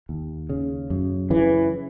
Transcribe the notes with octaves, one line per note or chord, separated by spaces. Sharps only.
D#2
C#3
F#2
C#3 E3